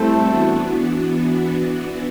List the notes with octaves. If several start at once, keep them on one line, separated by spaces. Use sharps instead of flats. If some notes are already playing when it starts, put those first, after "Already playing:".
Already playing: G3 A3 C4 E4 A4 C5
E3 B3 D4 F#4